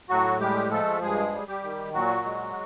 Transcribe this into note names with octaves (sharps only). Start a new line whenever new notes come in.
A2 F#3 F#4
G3 G#3 G4
F3 A3 A4
G2 G#3 G#4
G3
G3 G4
D#3
A#2 F#3 F#4
G#3